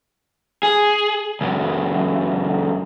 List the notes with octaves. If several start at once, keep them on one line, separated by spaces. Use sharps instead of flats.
G#4
C#2 F#2